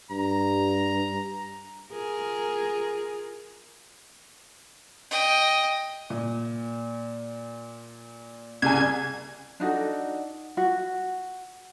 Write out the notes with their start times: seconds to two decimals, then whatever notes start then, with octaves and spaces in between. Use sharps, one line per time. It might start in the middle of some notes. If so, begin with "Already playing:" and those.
0.11 G2 A#5
1.92 F4 G#4 A#4
5.11 D#5 G5
6.10 A#2
8.62 C2 C#3 G#5 G#6
9.60 D4 D#4 F#4 A4
10.57 F#4